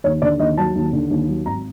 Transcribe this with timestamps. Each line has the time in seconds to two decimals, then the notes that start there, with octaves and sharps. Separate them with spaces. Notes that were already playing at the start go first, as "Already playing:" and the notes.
0.04 D#2 C#5
0.22 D3 D5
0.39 D#2 D#5
0.57 F#3 A5
0.75 D#2
0.93 D3
1.11 D#2
1.28 F#3
1.46 G#1 A#5